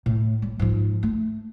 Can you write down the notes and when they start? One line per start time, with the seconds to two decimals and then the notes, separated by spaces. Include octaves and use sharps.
0.06 A2
0.42 G3
0.59 G#2 F3
1.03 A3